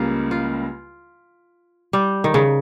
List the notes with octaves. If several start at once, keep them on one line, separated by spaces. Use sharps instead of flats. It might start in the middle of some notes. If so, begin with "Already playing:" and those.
Already playing: C#2 C#3 G3 A#3 F4
F4
G3
D#3
C#3